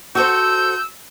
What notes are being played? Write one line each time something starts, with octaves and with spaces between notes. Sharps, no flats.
F#4 A4 C5 E6 G6